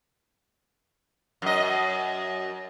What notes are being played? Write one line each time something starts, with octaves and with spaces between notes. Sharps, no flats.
F#2 D#5